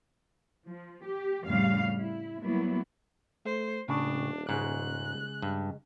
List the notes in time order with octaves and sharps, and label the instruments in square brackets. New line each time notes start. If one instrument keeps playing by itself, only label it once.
[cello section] F3
G4
F2 A2 C#3 G3 F5
E4
F#3 G3 A#3 B3 E4
[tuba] A3 [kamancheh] C5
[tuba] D#1 [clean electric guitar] A2 C#3 [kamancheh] D4
[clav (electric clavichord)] G#2 [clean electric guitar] C#3 G#3 [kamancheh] F#6
[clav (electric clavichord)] G2